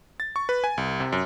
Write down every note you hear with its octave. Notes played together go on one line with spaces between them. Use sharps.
A6
C#6
B4
G#5
C2
C3
F#2